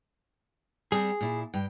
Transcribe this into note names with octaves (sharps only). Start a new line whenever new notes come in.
G3 C4 G4 G#4
A#2 E4
G2 G5